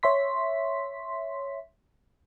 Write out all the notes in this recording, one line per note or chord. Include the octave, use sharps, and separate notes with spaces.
C#5 E5 C6 B6